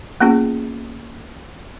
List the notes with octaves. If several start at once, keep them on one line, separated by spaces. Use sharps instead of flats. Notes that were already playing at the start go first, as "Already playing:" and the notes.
A#3 B3 C#4 F4 G#4